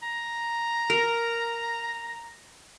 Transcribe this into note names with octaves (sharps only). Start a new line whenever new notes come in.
A#5
A#4